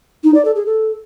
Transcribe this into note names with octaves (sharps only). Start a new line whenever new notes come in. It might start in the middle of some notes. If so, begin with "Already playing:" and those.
D#4
D5
A4
G#4
A4